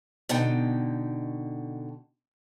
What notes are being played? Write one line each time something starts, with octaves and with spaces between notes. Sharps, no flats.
B2 D3 D#4 G5